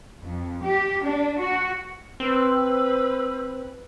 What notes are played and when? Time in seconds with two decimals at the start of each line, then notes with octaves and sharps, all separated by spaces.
0.22 F2
0.61 G4
1.04 D4
1.39 F#4
2.20 C4 B4 C5 E6